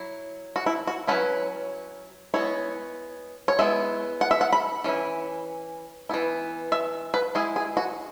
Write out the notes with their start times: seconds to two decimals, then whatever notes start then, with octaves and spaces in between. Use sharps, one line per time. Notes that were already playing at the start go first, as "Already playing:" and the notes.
Already playing: F#3 E4
0.56 F#4
0.66 E4
0.87 F#4
1.07 F#3 C#4 E4 B4
2.34 G#3 B3 E4 C#5
3.48 C#5
3.59 G#3 B3 E4 E5
4.21 F#5
4.31 E5
4.41 F#5
4.52 B5
4.84 E3 C#4 E4
6.09 E3 B3 E4
6.72 E5
7.14 B4
7.35 G#3 E4 G#4
7.56 G#4
7.77 F#4